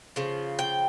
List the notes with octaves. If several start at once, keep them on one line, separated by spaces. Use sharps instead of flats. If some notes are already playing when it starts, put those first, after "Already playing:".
C#3 F3
G5